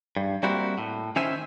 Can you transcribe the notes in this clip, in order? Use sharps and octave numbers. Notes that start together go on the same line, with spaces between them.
G2
G3 A#3 C4 E4 F#4
A2
D#3 C#4 E4 C5 E5 G#5